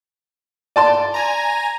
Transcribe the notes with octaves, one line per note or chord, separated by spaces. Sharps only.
D5 A5 C6
G#5 A#5